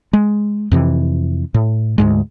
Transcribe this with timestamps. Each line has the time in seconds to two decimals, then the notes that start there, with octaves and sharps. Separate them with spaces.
0.13 G#3
0.72 F2 C3 E3
1.54 A2
1.98 D2 G#2 G#3